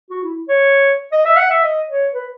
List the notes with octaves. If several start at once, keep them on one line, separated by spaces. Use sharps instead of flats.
F#4
E4
C#5
D#5
E5
F#5
E5
D#5
C#5
B4